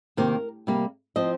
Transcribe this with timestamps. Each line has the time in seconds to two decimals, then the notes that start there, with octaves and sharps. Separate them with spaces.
0.17 C3 D#3 A#3 A#4
0.67 C3 G3 A#3
1.16 F3 C4 D#5